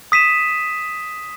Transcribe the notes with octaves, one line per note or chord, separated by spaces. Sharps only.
D#6 B6 D#7 E7